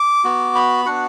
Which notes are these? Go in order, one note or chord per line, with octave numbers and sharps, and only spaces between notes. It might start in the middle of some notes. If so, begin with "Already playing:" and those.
Already playing: D6
B3 F#4
B5
B3 D4 F#4 F#5